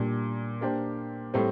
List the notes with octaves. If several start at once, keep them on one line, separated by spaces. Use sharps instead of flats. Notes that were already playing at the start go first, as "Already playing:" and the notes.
Already playing: A#2 G3 D4
A#3 D4 G4 C5
A2 G3 C4